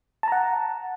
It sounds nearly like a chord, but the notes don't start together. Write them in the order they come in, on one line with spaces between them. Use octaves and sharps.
A5 A#5 F#5